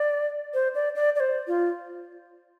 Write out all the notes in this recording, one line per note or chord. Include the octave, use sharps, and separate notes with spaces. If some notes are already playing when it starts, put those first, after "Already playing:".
Already playing: D5
C5
D5
D5
D5
C5
F4